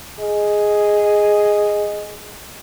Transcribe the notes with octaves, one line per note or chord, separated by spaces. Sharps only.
G#4 D#5